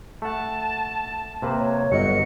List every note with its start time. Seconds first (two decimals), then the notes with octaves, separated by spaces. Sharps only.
0.22 A3 F#5 A5
1.42 C3 A#3 B4
1.59 C#5
1.92 G1 F#3 D#5 F#5 C#7